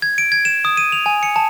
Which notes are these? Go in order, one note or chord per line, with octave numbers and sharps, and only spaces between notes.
G#6
D7
G#6
E7
D#6
D#7
F7
G#5
C#7
A5